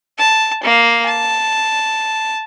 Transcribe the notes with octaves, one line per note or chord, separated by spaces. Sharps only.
A5
A#3 F5
A5